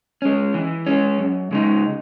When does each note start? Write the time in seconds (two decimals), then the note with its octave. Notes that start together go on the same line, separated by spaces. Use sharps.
0.22 G#3 C#4
0.54 E3
0.86 G#3 C#4
1.18 F#2
1.51 C#3 G#3 D#4